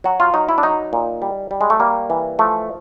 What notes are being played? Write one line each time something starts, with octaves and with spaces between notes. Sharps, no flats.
F#3 F#4
F4
F#3 D#4
E4
D4
F#3 D#4
A#2
G3
G3
G#3
A3
G3 A#3
E3
F3 A3